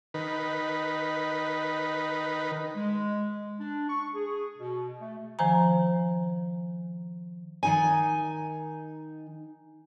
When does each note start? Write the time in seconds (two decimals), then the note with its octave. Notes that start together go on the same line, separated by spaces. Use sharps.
0.14 D#3 B4
2.75 G#3
3.59 D4
3.89 C#6
4.13 G#4
4.58 B2
4.99 A3
5.39 D#3 F3 C5 G#5 A#5
7.63 D#3 D#4 G#5